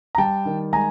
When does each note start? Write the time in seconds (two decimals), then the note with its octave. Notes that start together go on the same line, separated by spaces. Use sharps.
0.15 A#5
0.18 G3 G5 A5
0.45 D#3
0.73 G#3 G#5 A#5